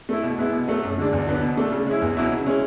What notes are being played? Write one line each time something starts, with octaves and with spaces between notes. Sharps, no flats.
A3 E4
B2
G#3 B3 E4
B2
F#3 A3
F#2
D3 G#3 D4
E2
D3 F#3 B3
B2
A3 D4
C#3
G#3 C#4 E4
E2
B2 F#3 C#4 E4
C#3
G#3 C#4 E4